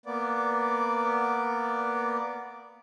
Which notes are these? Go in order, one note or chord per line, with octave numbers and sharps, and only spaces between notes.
A#3 B3 D5